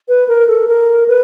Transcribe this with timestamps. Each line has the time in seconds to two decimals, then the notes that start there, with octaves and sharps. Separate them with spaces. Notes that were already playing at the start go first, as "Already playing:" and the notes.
0.08 B4
0.28 A#4
0.48 A4
0.68 A#4
1.08 B4